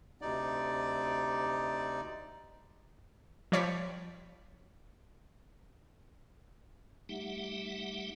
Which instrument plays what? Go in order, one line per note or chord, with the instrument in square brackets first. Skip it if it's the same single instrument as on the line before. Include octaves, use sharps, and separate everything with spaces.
[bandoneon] D2 C3 D#4 D5
[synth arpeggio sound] F3 G3 C#5 D5 B6
[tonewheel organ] G3 A3 D#4 G4 E5 F#5